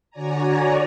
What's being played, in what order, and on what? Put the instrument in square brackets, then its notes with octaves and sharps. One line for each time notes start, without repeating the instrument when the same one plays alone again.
[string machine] D3 F#4 C#5 D5 G#5 A#5